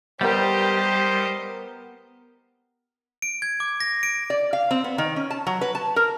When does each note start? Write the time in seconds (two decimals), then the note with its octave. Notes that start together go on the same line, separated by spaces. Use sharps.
0.21 G3 B3 G4 A#4 C5 D#5
3.22 D7
3.42 G#6
3.60 D6
3.80 A#6
4.03 D7
4.30 D5
4.53 F5
4.71 C4
4.84 B3
4.98 D#3
5.16 C#4
5.30 A5
5.47 F#3
5.61 B4
5.75 A5
5.96 A#4